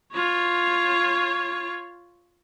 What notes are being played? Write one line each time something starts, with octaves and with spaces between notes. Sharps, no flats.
F4 C#5